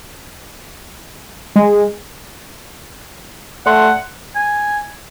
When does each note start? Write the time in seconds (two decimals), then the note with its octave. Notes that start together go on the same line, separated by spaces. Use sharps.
1.56 G#3
3.66 A3 D5 F#5 C6
4.35 G#5